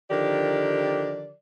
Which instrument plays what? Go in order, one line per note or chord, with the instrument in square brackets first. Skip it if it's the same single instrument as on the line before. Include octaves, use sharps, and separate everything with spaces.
[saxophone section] D3 D#3 F3 G4 A#4 D5